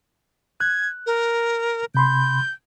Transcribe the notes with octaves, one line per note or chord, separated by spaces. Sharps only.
F#6 G#6
A#4
C3 B5 C6 G6